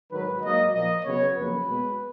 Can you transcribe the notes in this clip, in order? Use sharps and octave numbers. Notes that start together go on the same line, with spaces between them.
G#2 D#3 F#3 B4
G#2 F#3 A#3 D#5
A#2 F3 A#3 D#5
C#3 F#3 B3 C#5
F2 C#3 F#3 A#3 B4
B2 G#3 B3